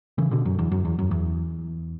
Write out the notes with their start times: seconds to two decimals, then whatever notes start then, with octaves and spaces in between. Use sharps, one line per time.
0.18 C#3 E3
0.31 B2 D3
0.45 F#2
0.59 E2
0.72 F#2
0.85 E2
0.99 F#2
1.11 E2